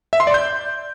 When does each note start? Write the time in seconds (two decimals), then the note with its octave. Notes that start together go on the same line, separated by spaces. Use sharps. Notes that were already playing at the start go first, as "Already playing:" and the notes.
0.13 E5
0.20 C6
0.27 D5
0.34 G6